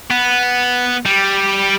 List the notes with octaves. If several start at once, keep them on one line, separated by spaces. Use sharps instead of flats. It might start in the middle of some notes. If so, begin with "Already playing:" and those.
B3
G3